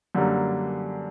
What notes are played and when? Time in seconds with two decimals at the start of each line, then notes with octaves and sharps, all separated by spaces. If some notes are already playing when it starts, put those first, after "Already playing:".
0.15 F#2 D3 G3 A#3